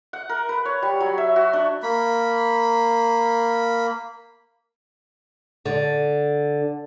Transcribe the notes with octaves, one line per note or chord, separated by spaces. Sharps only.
F#5
A#4
B4
C#5
G3
F#3
E5
F#4
D4
A#3 B5
D3